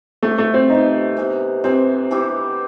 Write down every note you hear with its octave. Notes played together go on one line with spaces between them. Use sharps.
C3 E3 A3 B3
A3
C4
C3 E3 B3 D#4
C3 E3 B3
C3 E3 B3 C4
E3 B3 E4 G4